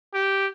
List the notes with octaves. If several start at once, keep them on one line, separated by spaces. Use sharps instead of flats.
G4